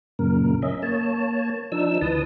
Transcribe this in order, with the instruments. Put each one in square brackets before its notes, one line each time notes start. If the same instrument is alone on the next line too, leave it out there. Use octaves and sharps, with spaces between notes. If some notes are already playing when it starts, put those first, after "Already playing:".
[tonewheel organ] F#2 A#2 C#3 A#4
C#4 D#5 E5
A#3 C#5 A5
F3 D4 D#4 E6
D2 E3 B4 A5 D#6